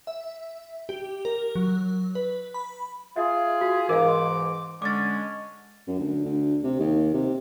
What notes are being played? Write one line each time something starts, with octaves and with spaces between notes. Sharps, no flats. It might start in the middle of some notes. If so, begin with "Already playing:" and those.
E5
G4
A#4
F#3
B4
B5
F4 G#4 E5
F#4
G#2 E3 A#4 D#5 F5 D6
C6
D3 G#3 C#4 D6 A6
F#2
D2
D2
C3
D#2
C3